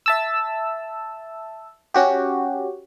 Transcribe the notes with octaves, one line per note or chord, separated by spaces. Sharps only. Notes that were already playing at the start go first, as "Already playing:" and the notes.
E5 A5 E6
C#4 F#4 G4